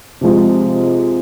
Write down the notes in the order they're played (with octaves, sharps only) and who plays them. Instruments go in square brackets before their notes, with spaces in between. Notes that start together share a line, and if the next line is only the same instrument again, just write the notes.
[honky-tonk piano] C3 F3 G#3